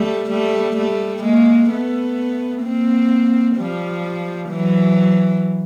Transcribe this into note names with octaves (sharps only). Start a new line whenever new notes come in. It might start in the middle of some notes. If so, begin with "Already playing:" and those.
Already playing: G3 A3
G3 A3
G3 A3
G#3 A#3
A3 B3
A#3 C4
F3 G3
E3 F#3